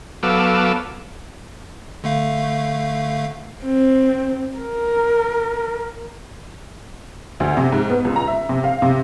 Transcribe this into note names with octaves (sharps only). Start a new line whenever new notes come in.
F#3 B3 A4 F5 D6 E6
D3 A3 F5
C4
A#4
D2
C3
G#2
B3
C#2
A#5
E5
C3
F5
C3